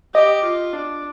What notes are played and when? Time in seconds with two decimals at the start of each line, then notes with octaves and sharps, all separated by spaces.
0.14 G4 D#5
0.44 F4
0.73 D4